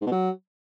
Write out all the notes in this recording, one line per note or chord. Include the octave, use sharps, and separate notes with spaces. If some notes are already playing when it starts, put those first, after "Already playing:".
G#2
B2
F#3